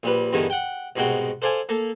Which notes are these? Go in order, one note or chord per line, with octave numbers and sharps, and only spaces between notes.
A#1 G3 B4
E2 G2 D3 D#3
F#5 G5
C2 G#2 B2 F#4 G5
A4 C5 D5 F5 G#5
A#3 A4